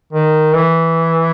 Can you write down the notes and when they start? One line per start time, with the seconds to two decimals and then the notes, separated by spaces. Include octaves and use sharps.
0.13 D#3
0.55 E3